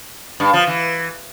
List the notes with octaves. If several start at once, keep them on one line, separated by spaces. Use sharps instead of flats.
G2
F3
E3